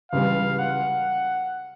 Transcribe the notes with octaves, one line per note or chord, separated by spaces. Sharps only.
C#2 C#3 E3 G3 F5
F#5